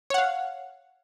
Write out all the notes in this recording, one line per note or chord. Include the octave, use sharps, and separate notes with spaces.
C#5 F5 F#5